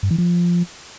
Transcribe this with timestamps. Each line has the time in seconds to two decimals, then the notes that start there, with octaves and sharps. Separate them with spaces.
0.03 G2
0.11 E3
0.18 F3